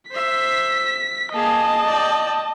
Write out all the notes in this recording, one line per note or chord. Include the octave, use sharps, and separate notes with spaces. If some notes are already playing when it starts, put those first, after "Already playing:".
C5 E5 B6
A#3 G#4 D#5 A5
D5 G5